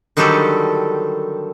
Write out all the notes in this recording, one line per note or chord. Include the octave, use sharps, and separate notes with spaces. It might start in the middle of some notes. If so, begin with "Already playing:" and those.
D3 D#3 F#3 G3 G4 A4